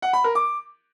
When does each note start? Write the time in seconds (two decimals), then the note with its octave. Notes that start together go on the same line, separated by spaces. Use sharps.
0.02 F#5
0.13 B5
0.24 A#4
0.35 D6